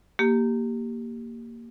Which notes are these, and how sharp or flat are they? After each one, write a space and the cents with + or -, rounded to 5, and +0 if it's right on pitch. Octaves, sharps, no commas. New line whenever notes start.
A#3 +0 G4 +0